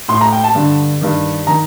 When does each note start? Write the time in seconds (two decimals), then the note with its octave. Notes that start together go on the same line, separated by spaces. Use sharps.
0.08 A2 C6
0.21 A#5
0.32 G5
0.44 A5
0.55 G2 D3
1.01 G2 D#3
1.47 D#3 A#5